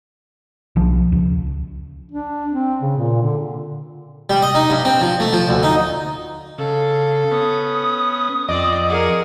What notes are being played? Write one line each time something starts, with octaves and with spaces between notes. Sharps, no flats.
B1 F3
C#2
D4
C4
C#3
A#2
D3
G3
D#5
D#4
G2
C4
F3
A3
F3
D2
D#4
C#3 A4 F5
B3 C#4 D#6
F2 C4 D5 D#5 D6
G#4 A#4 F#5